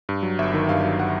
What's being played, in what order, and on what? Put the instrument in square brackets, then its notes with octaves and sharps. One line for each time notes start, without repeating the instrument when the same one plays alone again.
[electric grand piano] G2
F#3
G1 E5
D#3
G2 F5
F#3
F#5